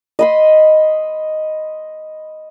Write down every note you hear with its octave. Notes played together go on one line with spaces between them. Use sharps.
D#5 B5 C6